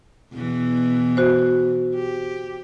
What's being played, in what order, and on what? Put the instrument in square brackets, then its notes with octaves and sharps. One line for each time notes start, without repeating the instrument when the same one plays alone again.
[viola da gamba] E2 B2 E3
[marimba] F#4 C5
[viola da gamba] G4